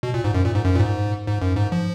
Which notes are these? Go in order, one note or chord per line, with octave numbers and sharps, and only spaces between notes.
B2
A#2
G#2
F#2
A#2
G#2
F#2
A#2
G#2
G#2
F#2
G#2
F3